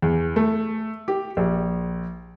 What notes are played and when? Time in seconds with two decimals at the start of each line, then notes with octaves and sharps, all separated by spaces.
0.02 E2
0.36 A3
1.08 G4
1.37 A#1